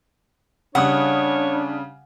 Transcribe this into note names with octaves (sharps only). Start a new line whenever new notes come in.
C#3 G3 D4 C#5 F#5 D#6